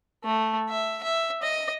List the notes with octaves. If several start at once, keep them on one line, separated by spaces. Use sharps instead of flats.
A3
E5
E5
D#5